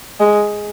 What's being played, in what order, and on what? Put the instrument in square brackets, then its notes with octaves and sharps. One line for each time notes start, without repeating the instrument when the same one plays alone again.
[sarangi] G#3